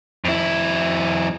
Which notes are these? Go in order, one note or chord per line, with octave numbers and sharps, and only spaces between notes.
F2 E4